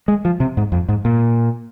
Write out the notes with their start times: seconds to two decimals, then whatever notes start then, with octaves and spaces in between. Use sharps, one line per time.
0.08 G#3
0.25 F3
0.40 C3
0.57 G#2
0.72 F2
0.89 G#2
1.05 A#2